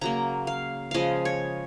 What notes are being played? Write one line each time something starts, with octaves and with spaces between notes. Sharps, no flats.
C#3 F#3 A#3 A#5
F5
C#3 F3 G#3 D#5 F5
C#5